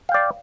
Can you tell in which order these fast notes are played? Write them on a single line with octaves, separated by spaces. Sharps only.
F5 G5 D5